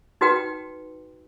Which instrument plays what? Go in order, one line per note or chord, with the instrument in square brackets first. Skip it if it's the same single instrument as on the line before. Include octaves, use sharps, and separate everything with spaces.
[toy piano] D#4 F#4 B4 G5